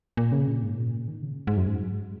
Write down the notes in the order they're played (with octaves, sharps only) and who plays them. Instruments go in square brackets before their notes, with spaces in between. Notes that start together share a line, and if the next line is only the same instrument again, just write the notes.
[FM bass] A#2
C#3
A#2
G#2
A#2
D#3
C#3
G#2
F#2
G#2